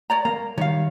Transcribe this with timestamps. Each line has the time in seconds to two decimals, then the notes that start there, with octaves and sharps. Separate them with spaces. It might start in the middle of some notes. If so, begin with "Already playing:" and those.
0.10 C#5 D5 A#5
0.25 A#3 A#5
0.58 D#3 G3 C#5 F5